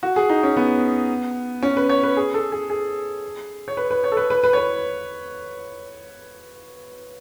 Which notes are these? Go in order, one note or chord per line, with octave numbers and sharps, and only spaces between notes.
F#4
G#4
D#4
C#4
B3
C#4
B4
C#5
B4
G#4
A4
G#4
G#4
C#5
B4
B4
C#5
A4
B4
B4
B4
C#5
B4